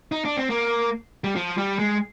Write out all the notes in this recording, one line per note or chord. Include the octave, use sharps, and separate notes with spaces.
D#4
D4
C4
A#3
G3
F3
G3
G#3